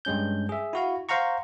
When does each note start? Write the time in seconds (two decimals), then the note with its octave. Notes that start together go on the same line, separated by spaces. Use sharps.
0.05 G2 G#3 C#4 G6
0.49 G#4 E5
0.73 E4 F#4 F5
1.09 C5 F5 F#5 A#5 C#6